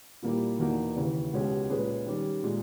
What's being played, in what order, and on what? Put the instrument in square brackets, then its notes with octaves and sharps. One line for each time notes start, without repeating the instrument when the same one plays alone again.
[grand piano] A#2 G3 A#3 E4 G4
E2 B2 A#3 D#4
D#2 C#3 E3
C#2 B2 G#3 C#4 G4
A#2 G#3 C#4 G#4 B4
D#3 G3 C#4
A#2 G#3